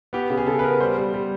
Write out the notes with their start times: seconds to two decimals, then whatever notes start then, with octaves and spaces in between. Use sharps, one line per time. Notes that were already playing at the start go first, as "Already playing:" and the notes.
0.13 B3 G4
0.30 C#3
0.37 G#4
0.46 C#3 A4
0.59 B4
0.63 B3 A#4
0.80 G3 C5
0.98 G3
1.14 G3